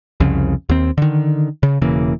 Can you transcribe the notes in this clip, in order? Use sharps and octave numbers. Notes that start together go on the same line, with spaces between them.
C2 F2 C#3
D#2 C4
D3 D#3
C#3
E1 C#3 E3 A#3